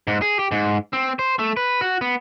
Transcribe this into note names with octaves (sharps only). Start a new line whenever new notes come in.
G#2
G#4
G4
G#2
C4
C5
A3
B4
F#4
B3